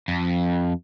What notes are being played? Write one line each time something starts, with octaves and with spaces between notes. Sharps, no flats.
F2